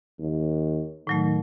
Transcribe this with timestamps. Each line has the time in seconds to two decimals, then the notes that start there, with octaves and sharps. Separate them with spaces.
0.19 D#2
1.07 A2 D#3 F#3 A3